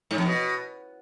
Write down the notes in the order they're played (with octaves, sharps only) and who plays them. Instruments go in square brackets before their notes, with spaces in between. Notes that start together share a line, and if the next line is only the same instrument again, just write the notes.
[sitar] G#2
F2
B2